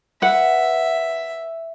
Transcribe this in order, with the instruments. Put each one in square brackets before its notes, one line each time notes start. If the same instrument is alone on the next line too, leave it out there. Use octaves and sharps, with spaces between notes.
[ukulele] B4 F#5 [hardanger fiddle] E5